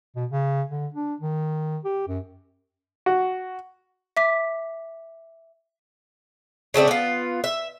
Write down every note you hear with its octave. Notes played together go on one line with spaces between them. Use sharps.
B2
C#3
D3
D4
D#3
G4
F#2
F#4
E5 D6 B6
C#3 A3 C4 D5
B3 F4
E5